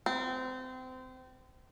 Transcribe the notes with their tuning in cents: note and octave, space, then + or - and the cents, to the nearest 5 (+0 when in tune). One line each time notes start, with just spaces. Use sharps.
C4 -25